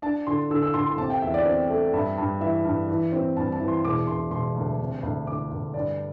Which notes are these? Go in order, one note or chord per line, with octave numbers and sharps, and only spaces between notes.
D4 A5
D3 C6
D3 E6
E6
D3 C6
C6
C3 A5
G5
E2 E5
D5
C4
A3
G2 E5
G2
E3 E5
G2
E3
C4
G2 A5
A5
E3
C6
E1 D6
E1 C6
E1 C6
D2
C3
D2
D2 D6
D2
G2 D5